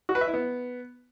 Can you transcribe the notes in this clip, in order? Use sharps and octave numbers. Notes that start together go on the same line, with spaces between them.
F#4
B4
E5
E4
B3